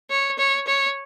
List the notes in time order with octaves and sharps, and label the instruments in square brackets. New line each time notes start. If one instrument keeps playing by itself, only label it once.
[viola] C#5
C#5
C#5